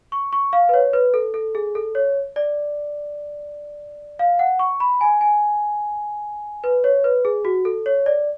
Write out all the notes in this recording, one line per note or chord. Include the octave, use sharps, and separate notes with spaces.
C#6
C#6
F5
B4
C#5
B4
A4
A4
G#4
A4
C#5
D5
F5
F#5
C#6
B5
G#5
G#5
B4
C#5
B4
G#4
F#4
A4
C#5
D5